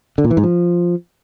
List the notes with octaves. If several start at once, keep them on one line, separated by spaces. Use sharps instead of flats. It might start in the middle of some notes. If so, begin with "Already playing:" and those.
D3
A#2
E3
G#2
F3